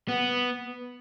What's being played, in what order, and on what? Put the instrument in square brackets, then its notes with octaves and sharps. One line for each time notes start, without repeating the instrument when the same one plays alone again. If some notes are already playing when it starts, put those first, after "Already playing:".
[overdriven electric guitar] B3